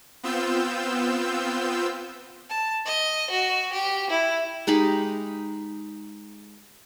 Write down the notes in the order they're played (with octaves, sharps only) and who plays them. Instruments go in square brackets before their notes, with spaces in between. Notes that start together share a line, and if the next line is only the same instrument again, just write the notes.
[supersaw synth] B3 C4 F4 E6 G6
[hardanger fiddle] A5
D#5
F#4
G4
E4
[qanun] G#3 D#4 G4 B5